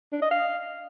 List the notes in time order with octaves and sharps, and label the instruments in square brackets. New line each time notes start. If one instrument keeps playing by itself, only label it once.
[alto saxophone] D4
D#5
F5